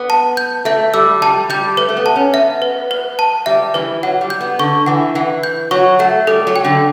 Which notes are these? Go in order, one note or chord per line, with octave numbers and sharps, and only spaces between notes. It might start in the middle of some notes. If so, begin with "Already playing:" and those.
Already playing: B3
A5
G6
A3 E5
G3 E6
G3 A5
G3 G6
A3 B4
A3
B3
A5
C#4
B3 E5
B4
B4
A5
G3 E5
E3 B4
F#3 F#5
G3
G6
B3
D3 C#6
E3 F#5
E3 F#5
G6
F#3 C#6
A3 F#5
G3 A4
F#3
G5
D3